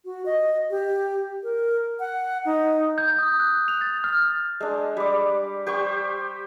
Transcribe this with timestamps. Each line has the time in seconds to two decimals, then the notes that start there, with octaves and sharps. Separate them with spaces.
0.05 F#4
0.26 D#5
0.70 G4
1.43 A#4
1.99 F#5
2.45 D#4
2.98 G6
3.18 D#6
3.40 F#6
3.68 F7
3.81 A6
4.04 F6
4.60 G#3 D4
4.97 G3 D6
5.67 G4 C5 G5 C#6